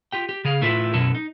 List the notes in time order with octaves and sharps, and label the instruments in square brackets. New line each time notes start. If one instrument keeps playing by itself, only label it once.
[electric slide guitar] F4 G4 G5
G4
C#3 G#4 F5
A2 E4 F4 A4 B4 E5
F#2 B2 F#3 C#4 E4 A4
D#4